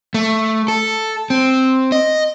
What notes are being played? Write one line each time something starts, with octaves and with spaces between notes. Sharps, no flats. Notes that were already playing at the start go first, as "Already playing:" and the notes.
A3
A4
C4
D#5